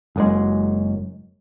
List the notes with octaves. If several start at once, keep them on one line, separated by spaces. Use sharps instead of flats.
F#1 F#2 G#3